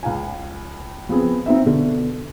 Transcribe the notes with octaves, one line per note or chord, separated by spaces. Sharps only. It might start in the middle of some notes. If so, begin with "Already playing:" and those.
C#2 F5 G#5
F3 B3 C4 G#4
C4 D#4 E5
B2 D3